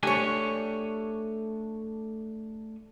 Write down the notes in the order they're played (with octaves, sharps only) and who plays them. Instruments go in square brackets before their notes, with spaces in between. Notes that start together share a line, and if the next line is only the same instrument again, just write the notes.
[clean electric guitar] A3 D4 G#5 [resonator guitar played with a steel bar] G4 C#5